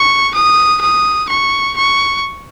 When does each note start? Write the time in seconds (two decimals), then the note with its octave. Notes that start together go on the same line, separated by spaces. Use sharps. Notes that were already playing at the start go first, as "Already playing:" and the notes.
Already playing: C#6
0.35 D#6
0.81 D#6
1.29 C#6
1.77 C#6